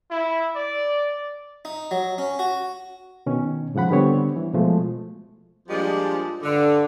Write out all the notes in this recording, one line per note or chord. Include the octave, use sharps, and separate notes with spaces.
E4
D5
D#4
F#3
C#4
F#4
B2 D#3 C#4
G#2 C#3 F3 F#5 B5
D3 G3 B3 C4 C#5
E3
B2 F3 G#3 A3
A#2 F3 G3 G#3 D4
G2 D3